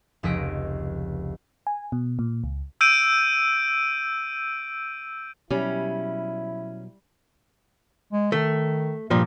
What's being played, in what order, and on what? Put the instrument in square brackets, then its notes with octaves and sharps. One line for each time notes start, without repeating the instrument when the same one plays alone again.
[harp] F1 C#2 D#5 B6 D7
[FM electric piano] G#5
B2
A#2
C#2
[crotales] E6 G6 D7 D#7
[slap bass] B2 F#3 [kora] G3 [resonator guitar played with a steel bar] C#4 [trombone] E4
[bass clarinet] G#3
[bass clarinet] D#3 [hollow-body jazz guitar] A3
[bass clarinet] G2 [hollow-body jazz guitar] A#2 F3 G3